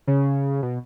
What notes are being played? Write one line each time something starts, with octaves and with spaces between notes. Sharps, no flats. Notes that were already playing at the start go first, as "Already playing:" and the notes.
C#3
B2